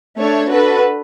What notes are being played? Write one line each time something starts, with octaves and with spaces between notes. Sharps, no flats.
A3 D4 A4 C#5
D4 F#4 A4 B4